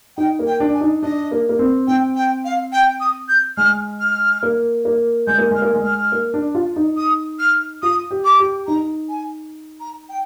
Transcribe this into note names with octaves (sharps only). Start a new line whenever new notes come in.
D#4 G5
A#3
G5
D4
G#5
D#4
D4 D#5
A#3
A#3
C4
C4 G5
G5
F5
G5
D#6
G6
G#3 F6
F6
A#3
A#3
G#3 G6
A#3
G#3 F6
A#3
G#3
F6
A#3
D4
F4
D#4
D#6
F6
F4 D#6
G4
D6
G4
D#4 A#5
G#5
A#5
G5